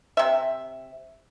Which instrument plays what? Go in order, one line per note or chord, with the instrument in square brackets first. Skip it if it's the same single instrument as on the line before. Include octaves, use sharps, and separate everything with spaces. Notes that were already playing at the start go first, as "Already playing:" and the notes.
[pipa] C3 E5